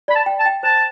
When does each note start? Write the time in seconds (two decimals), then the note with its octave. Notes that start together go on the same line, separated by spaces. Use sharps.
0.08 D5 B5
0.15 A5
0.26 G5
0.39 A5
0.46 G5
0.63 C5 A5